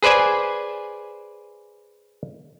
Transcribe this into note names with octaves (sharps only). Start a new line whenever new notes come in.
G#4 B4 C5 D5 G#5